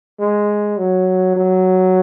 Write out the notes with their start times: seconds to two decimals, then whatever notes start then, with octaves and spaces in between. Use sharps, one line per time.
0.19 G#3
0.77 F#3
1.36 F#3